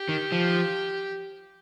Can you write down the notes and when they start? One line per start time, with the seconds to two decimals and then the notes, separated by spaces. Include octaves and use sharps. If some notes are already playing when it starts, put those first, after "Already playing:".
Already playing: G4
0.09 D#3
0.32 F3